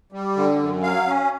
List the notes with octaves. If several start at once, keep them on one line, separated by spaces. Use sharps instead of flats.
G3
D3
F#2
F#3 F5
C#4